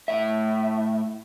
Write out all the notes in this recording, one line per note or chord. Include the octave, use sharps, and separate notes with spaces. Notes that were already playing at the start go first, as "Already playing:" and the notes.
A2 E5